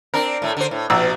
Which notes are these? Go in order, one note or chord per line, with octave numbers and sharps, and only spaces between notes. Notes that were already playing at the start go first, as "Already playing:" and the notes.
C4 D4 A#4
A2 A3
D3 C5
A2
A#1 B2 E6